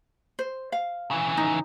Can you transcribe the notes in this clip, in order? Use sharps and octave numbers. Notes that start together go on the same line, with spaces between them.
C5
F5
C#3 E3
D#4